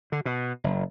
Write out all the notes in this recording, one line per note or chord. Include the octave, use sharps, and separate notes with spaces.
D3
B2
F#1